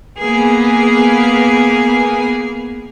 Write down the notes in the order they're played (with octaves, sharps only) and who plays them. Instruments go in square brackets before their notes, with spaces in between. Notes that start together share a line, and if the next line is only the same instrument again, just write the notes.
[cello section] A#3 B3 G#4